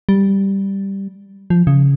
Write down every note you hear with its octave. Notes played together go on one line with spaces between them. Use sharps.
G3
F3
C#3